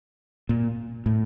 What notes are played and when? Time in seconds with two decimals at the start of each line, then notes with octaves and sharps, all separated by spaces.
0.49 A#2
1.06 A2